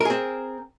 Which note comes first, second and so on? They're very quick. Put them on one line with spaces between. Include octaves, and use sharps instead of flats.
A#4 G#4 C4